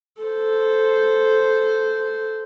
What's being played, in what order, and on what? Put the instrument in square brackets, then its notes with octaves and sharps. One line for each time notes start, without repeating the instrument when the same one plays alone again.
[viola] A4 C5